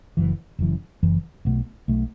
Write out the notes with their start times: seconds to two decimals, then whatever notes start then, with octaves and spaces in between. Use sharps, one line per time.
0.17 F#1 F#2 E3
0.59 F#1 F#2 E3
1.03 F#1 F#2 E3
1.45 B1 B2 A3
1.88 B1 B2 A3